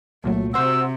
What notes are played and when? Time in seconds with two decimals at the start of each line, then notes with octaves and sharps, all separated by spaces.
0.24 C2 A#2 F#3 A3
0.54 C3 F#4 C5 E6